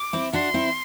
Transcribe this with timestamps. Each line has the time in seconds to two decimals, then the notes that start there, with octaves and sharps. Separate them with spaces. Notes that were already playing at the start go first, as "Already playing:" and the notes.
Already playing: D6
0.13 C4 E4
0.33 D4 F#4 C6
0.54 C4 E4